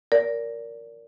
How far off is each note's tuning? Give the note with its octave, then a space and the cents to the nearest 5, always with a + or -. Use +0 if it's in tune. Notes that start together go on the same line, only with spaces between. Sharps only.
A#4 +0 D5 -20